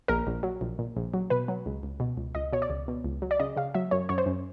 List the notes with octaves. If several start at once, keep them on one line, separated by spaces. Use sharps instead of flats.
A#1 A#4
A#1
F#3
A#1
A#2
A#1
F#3
B2 B4
F#3
C#2
C#2
B2
C#2
C#2 D#5
B2 C#5
D5
C#2
B2
C#2
F#3
D5
C#3 D#5
C#3 F5
F#3 E5
F#2 C#5
F#2 C#5
C5
F#2